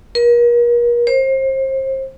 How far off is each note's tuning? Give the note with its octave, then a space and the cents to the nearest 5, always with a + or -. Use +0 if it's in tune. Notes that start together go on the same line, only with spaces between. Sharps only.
A#4 +40
C5 +30